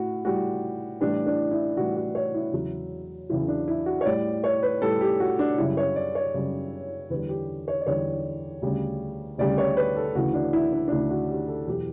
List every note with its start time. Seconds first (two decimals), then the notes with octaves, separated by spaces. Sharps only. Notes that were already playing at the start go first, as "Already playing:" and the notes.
Already playing: A2 F#4
0.25 A2 G3 F#4
1.01 A2 E3 G3 D4
1.26 D4
1.51 E4
1.77 A2 E3 G3 F#4
1.97 F#4
2.15 C#5
2.34 E4
2.53 E2 C#3 F#3
3.29 E2 C#3 F#3 E4
3.48 D4
3.68 E4
3.86 F#4
4.01 C#5
4.05 A2 G3 D5
4.44 C#5
4.63 B4
4.82 A2 G3 A4
5.01 G4
5.20 F#4
5.39 D4
5.58 F#2 C#3 G3 E4
5.77 C#5
5.96 D5
6.15 C#5
6.34 F#2 C#3 G3
7.10 E2 D3 G3 B4
7.29 G4
7.68 C#5
7.81 D5
7.86 E2 D3 G3 C#5
8.62 D2 C#3 G3
9.38 D2 C#3 G3 D5
9.58 C#5
9.77 B4
9.96 A4
10.15 D2 C#3 E3 F#4
10.34 D4
10.53 E4
10.72 D4
10.88 D4
10.91 D2 C#3 E3 E4
11.11 F#4
11.29 G4
11.48 A4
11.67 E2 B2 F#3 G4